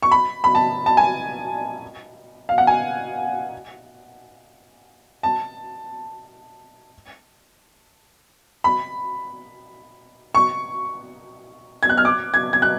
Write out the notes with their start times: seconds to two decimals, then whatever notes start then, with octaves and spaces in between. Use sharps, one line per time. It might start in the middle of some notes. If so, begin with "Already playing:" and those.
0.03 C#6
0.12 B5
0.44 B5
0.55 A5
0.86 A5
0.97 G#5
2.49 F5
2.58 F#5
2.67 G#5
5.23 A5
8.64 B5
10.35 C#6
11.83 G#6
11.89 F#6
11.98 F6
12.05 D6
12.34 G#6
12.53 G#6
12.62 F#6